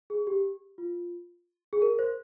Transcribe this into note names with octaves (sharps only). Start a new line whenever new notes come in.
G#4
G4
F4
G#4
A#4
C5